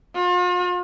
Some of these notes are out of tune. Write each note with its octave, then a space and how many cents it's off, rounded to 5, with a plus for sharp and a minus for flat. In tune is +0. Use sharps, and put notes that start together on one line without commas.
F4 +40